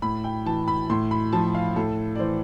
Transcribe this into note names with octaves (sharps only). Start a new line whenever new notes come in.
A2 B5
G5
E3 A5
B5
A2 C6
B5
F3 A5
F5
A2 A4
D5
E3 C5